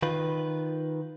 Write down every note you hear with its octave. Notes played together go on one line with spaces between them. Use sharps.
D#3 F4 B4